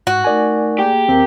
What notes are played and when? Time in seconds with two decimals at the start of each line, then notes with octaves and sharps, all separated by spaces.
0.07 G#2 F#4
0.24 A3 D#4 A#4 D5 G#5
0.79 A#3 G4 G#4
1.09 D#2 C4 A#4 F5 A#5